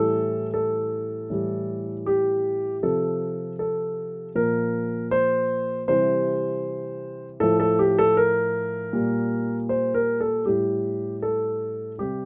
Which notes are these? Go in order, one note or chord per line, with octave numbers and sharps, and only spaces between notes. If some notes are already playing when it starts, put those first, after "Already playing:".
Already playing: A2 E3 G3 A4
A4
A2 E3 G3
G4
C3 F3 A4
A4
A#2 F3 A#4
C5
C3 E3 G3 C5
A2 F3 A4
A4
G4
A4
A#4
A#2 G3
C5
A#4
A4
A2 G3 G4
A4
C3 G3 G4